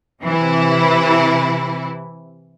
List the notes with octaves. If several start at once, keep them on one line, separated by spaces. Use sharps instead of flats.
C3 E3 E4